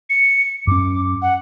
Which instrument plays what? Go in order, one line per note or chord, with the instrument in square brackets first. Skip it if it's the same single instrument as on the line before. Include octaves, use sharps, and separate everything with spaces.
[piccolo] C#7
[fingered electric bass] F#2 C#4 [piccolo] D6
[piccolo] F#5